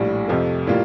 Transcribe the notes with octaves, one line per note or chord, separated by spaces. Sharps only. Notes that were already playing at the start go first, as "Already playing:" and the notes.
Already playing: A#1 A2 G3
F2 C3 F3 A3
A2 G3 A#3 F4